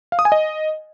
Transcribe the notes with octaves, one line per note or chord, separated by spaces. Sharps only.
F5
D#6
G#5
D#5